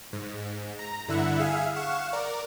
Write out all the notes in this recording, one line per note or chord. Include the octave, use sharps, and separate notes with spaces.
G#2
A#5
G2 D3 E4 E5 F#5
G#4 E5 F5 G#5
F5 F#5 C#6 E7
A#4 D5